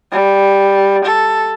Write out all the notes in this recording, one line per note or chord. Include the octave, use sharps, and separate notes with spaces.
G3
A4